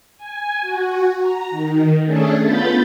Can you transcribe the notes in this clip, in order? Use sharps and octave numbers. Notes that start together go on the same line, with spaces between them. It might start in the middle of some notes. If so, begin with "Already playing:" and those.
G#5
F#4
A#5
D#3
A3 C#4 D4 G#4 A4
B3 F4 B5 G6 A6